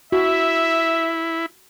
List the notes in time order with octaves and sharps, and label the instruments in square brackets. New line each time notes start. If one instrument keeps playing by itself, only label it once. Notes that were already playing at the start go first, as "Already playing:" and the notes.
[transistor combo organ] E4 [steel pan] F#4 [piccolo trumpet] E5